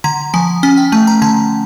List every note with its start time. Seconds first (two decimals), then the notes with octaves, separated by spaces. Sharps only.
0.04 D3 A#5
0.34 F3 G#5
0.63 C#4 G#5
0.77 G5
0.92 A3 A5
1.07 A#5
1.22 D3 A5